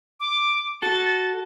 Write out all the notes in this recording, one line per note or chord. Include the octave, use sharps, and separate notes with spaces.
D6
F#4 A4 A6